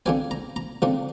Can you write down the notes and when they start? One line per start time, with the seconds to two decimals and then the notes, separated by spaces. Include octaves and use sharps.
0.06 D3 F3 C4 G#5
0.31 A#5
0.56 A#5
0.82 D3 F3 C4